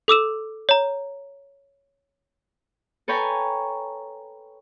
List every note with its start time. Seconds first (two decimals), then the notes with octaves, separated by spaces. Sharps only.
0.08 A4 D6 E6 E7
0.69 C#5 A#5
3.08 A4 B4 C#5 G5 G#5 A#5